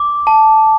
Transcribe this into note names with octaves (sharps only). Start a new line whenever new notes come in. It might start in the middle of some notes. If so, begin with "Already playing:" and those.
Already playing: D6
A5